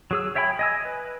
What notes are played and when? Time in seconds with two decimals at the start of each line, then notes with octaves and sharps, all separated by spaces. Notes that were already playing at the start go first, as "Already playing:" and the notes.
0.11 F#3 G#4 E6
0.35 C#5 E5 G5 G#5 B5
0.59 D#5 G#5 E6
0.85 B4